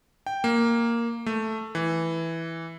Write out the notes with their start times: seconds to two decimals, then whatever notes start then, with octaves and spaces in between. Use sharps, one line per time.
0.26 G5
0.44 A#3
1.26 A3
1.75 E3